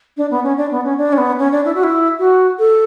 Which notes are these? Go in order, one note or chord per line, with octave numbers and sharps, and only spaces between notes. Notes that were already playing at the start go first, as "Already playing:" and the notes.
D4
B3
C#4
D4
B3
C#4
D4
C#4
B3
C#4
D4
E4
F#4
E4
F#4
A4